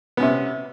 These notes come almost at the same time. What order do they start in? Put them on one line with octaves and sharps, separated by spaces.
B3 C#4 C3